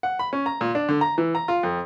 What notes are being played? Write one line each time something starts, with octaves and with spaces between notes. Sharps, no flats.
F#5
B5
C#4
A#5
A#2
D4
D3
A#5
E3
A#5
F4
F2